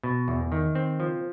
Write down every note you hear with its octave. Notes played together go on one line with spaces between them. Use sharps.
B2
E2
D#3
C4
F3